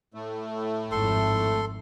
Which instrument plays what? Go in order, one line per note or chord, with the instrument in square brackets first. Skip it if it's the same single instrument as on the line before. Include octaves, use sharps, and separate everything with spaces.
[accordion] A2 A3
[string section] G#1 F2 [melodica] A4 C6